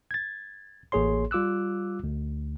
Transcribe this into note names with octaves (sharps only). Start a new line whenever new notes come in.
G#6 A6
A1 A#3 G#4 C#5 C6
G3 F4 D6 E6 F#6
D2